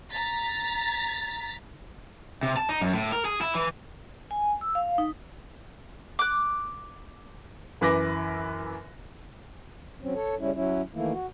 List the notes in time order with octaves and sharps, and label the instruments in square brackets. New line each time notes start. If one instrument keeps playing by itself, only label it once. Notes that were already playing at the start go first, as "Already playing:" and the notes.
[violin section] A#5 A6 B6
[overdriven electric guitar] C3
A5
D#4
F#2
A2
A#4
G#4
E4
E3
[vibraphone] G#5
E6
F5
D#4
[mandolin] D6 F#6
[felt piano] F#2 E3 B4 D6 A#6
[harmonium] F#3 C4 C#4
A4 C#5
C#3 G3 C#4 E4
F#3 C#4 E4
D#3 E3 A3 A#3 E4
F#4